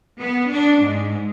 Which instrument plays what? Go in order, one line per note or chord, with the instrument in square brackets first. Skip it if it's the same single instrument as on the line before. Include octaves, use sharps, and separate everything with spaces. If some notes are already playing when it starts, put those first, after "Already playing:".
[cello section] B3
D4
G#2